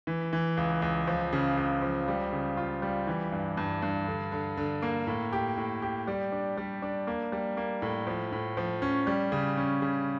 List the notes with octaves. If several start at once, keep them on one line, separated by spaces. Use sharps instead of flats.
E3
E3
C#2
C#2
F3
C#3
C#2
F3
G3
C#3
F4
G3
E3
G2
G2
G2
D3
D3
D3
A#3
A2
G4
A2
G4
G3
D4
G3
D4
A#3
G3
A#3
A2
F3
A2
F3
C#4
G3
C#3
C#4
C#3